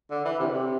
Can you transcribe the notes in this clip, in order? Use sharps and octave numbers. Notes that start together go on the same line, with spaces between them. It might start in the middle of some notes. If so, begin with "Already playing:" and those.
D3
E3
C3
D3
C3